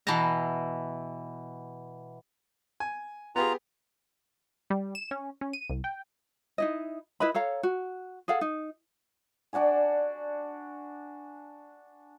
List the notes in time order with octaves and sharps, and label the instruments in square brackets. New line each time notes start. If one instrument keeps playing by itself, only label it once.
[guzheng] B2 E3 F5 A5 A#5
[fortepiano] G#5
[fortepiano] B3 G4 G#4 [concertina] F4 A#5
[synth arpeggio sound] G3
E7
C#4
C#4
D#7
C2
G5
[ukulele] D#4 E4 D#5
E4 B4 D#5 B5
A4 C#5 F5 A#5
F#4
G#4 A4 F5 F#5
D#4
[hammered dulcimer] D4 F#4 D5 G#5